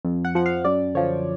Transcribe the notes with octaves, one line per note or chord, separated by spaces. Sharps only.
F2
F#5
F3 F#5
F5
F#2 D5
D3 F3 C#5